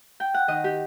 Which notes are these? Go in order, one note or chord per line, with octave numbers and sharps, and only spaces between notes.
G5
F#5
D#3 D#5
G4